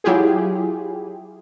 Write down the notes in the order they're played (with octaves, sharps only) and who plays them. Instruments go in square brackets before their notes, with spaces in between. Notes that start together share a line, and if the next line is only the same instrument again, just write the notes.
[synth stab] F#3 E4 F4 G4 G#4